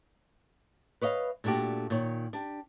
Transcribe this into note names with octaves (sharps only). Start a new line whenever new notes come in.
B4 C#5 D#5 F5
A#2 A3 D4 F#4 G4
A#2 D#3 C#5
D4 G4